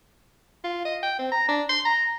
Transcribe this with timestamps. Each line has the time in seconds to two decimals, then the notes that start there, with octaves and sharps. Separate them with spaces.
0.64 F4
0.85 D#5
1.03 G5
1.19 C4
1.32 A#5
1.49 D4
1.69 C6
1.85 A#5